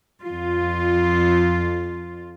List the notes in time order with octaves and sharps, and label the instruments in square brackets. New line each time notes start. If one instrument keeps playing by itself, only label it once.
[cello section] F2 F4